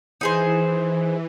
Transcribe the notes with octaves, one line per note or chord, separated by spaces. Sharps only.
E3 D#4 G#4 C5